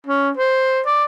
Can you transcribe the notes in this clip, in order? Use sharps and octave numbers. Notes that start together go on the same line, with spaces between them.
C#4
C5
D5